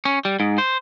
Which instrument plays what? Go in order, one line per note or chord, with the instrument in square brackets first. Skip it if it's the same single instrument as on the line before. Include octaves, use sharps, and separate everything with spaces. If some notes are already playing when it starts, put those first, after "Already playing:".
[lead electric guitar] C#4
G3
G#2
C5